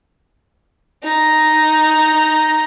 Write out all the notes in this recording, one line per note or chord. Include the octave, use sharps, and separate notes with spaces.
D#4 A#5